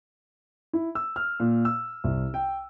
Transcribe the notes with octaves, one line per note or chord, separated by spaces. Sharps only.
E4
E6
F6
A#2
E6
C2
G5